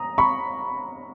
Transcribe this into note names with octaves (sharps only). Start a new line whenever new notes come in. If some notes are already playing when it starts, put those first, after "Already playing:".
Already playing: A#5 D#6
B5 C#6